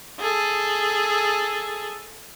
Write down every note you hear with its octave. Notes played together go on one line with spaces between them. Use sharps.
G#4 A4